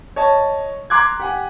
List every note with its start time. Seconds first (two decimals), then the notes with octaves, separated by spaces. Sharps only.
0.16 C#5 D#5 A5
0.90 A#5 C6 D6 F#6 G#6
1.20 G4 F#5 G#5